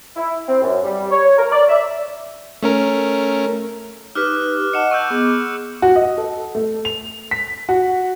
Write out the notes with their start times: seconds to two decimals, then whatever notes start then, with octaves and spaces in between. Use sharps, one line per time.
0.16 E4
0.48 C4
0.62 F#2
0.84 G3
1.11 C#5
1.38 A#4
1.52 D5
1.69 E5
2.63 A3 C#4 A#4
4.15 D#4 G4 B4 D6 F6 F#6
4.73 D#5 F#5 A5 C#7 E7
4.91 C#6 E6 G6
5.10 B3 G#4 D6
5.30 E6
5.82 F#4
5.96 D#5
6.18 A4
6.55 A3
6.85 F7
7.31 B6
7.69 F#4